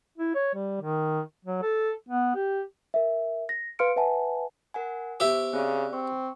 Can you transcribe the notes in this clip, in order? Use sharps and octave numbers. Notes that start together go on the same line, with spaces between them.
E4
C#5
G3
D#3
F#3
A4
B3
G4
A#4 E5
A#6
B4 F5 C6 F6 C#7 D7
B4 E5 F#5 G#5 A5
A#4 F#5 G#5
B3 G4 C5 E5
C#3 C4 G#4 D5
C4 C#6